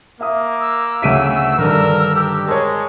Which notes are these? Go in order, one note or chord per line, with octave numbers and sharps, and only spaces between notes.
A#3 E5 D#6
E6
D2 C#3 E5 B6 D7 D#7
G2 D3 D#3 D4 A#4
G4
G#3 A#4 C#5 A5